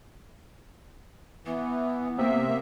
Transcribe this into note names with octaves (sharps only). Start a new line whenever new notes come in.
E3 B3
C3 A#3 E5